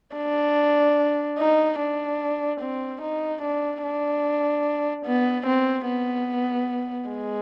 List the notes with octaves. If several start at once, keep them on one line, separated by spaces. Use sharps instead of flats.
D4
D#4
D4
C4
D#4
D4
D4
B3
C4
B3
G#3